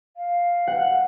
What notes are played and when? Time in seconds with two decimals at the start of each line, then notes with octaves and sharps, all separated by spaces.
0.17 F5
0.67 F#5